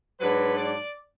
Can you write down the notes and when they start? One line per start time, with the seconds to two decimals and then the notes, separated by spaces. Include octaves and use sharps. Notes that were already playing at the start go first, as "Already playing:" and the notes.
0.20 G#2 F#3 D4 B4
0.57 D5